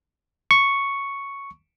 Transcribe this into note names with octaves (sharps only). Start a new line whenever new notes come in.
C#6